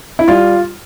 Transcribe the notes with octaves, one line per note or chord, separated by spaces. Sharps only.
E4
G3 F4